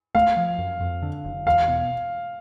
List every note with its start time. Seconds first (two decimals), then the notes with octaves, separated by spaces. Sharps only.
0.15 A3 F5
0.37 F3
0.59 F#2
0.80 F2
1.02 D3
1.24 F#1
1.46 E2 F5
1.68 B2